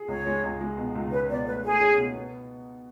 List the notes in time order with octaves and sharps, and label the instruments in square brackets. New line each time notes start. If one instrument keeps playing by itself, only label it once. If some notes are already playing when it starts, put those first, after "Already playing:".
Already playing: [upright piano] G#4
[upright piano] C#2 [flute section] C#5
[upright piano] G#3
C#2
G#3
B2
C#2
[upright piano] C#4 [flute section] B4
[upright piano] B2 [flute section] D5
[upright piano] A3 [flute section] B4
[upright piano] A3 [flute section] G#4
[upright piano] C#4
B2
B3